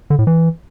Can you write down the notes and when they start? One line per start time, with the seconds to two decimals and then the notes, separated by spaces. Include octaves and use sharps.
0.10 D3
0.19 A2
0.27 E3